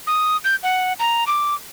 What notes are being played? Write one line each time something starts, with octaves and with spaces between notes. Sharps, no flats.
D#6
G6
F#5
A#5
D6